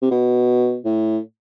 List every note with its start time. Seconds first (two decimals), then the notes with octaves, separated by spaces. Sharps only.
0.02 C3
0.11 B2
0.85 A2